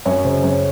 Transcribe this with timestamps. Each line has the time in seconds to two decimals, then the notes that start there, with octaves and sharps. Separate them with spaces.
0.05 F#2 C#5
0.25 C#3 C5
0.43 F#2 C#5